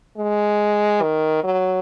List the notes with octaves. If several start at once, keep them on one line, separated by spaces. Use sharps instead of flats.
G#3
D#3
F#3